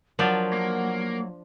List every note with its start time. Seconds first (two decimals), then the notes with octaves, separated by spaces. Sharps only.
0.19 F3 F#3 D4 F4 A#4 F#5
0.53 A#3